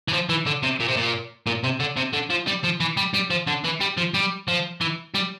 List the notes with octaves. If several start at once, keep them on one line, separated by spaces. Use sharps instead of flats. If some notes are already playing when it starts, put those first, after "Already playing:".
E3
F3
E3
D3
C3
A#2
C3
A#2
A#2
C3
D3
C3
D3
F3
G3
F3
E3
G3
G3
F3
D3
E3
G3
F3
G3
F3
E3
G3